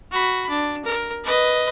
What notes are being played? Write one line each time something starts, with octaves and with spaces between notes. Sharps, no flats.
F#4 B5
D4
A#4
B4 D#5